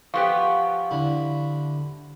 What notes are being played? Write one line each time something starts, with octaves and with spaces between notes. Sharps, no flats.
F3 B3 G4 F5 C#6
D3 E4